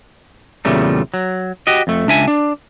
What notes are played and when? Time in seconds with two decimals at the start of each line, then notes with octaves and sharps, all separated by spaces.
0.65 E2 A#2 C#3 G3 A3
1.14 F#3
1.67 F#4 G4 D#5
1.87 F2 A3
2.07 C#2 D4 E5 G#5
2.28 D4